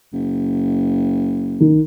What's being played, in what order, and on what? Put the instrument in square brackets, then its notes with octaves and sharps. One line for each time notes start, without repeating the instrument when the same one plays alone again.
[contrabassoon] F#1
[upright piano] D#3